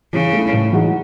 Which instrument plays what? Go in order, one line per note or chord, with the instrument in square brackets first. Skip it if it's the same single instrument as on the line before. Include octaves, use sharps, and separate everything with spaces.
[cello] C#3 [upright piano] E3
[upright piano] A3 E4
A2
E3 G#3 D#4 F#4